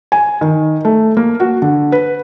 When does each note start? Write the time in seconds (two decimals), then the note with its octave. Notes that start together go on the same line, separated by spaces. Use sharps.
0.12 G#5
0.41 D#3
0.85 A3
1.17 A#3
1.40 F#4
1.62 D3
1.92 B4